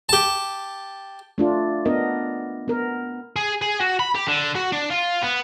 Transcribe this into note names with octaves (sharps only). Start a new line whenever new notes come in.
G4 A5
A3 D4 F4
B3 D4 A#4 D#5
B3 A#4
G#4
G#4
F#4
B5
G4
D3
F#4
D4
F4
B3